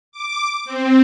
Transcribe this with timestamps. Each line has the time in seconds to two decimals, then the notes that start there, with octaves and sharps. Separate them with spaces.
0.12 D6
0.65 C4